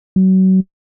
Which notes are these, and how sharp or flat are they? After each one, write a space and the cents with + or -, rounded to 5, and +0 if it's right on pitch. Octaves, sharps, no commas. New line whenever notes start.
F#3 +30